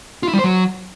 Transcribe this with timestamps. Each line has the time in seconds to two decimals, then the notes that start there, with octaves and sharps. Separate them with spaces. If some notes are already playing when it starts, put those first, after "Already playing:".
0.23 F4
0.28 E4
0.33 G3
0.39 C5
0.44 F#3